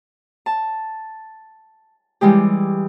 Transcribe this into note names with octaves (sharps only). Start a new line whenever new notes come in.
A5
E3 G3 G#3 G4